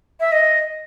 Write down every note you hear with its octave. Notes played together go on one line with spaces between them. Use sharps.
E5
D#5